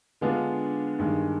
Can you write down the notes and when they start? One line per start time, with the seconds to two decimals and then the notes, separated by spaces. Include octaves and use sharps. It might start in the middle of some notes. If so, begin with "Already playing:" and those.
0.21 D3 G#3 B3 D4 F4
0.99 G2 D#3 G#3